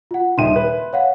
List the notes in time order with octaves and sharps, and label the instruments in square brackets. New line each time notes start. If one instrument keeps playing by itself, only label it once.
[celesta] F4 F#5
[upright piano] D#1 D#4 D#7 [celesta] E5 G5 C6
[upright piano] B4
[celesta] C#5 F5 F#5